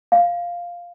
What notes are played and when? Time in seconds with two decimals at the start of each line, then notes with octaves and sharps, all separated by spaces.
0.12 F5